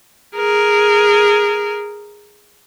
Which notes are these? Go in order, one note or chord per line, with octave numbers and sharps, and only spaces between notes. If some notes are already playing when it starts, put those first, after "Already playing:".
G#4 A#4